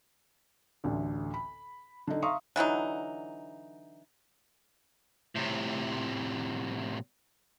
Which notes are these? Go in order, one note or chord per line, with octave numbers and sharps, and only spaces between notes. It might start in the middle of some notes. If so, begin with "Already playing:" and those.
A1 D2 D3
B5
D3 D#4
E5 F5 A#5 C6 C#6 D#6
D3 E3 F#3 D#4
A2 C3